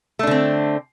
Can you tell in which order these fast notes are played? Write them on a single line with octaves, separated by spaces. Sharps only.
A3 D4 D3 C4